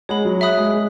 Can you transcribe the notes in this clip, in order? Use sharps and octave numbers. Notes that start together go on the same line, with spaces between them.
G#3 C#5 F#5 B5
F#3
E5 B5 D#6 F#6
G#3
G#3